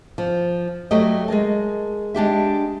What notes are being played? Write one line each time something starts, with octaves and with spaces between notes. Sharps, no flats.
F3
F#3 G3 A3 G4 D#5
G#3 G#4 A#4 A5
G#3 D4 G4 E5